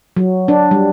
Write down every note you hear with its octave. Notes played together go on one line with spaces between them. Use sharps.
F#3
D4
G3